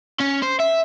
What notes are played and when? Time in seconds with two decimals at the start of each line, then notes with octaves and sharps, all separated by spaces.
0.21 C#4
0.43 C5
0.60 E5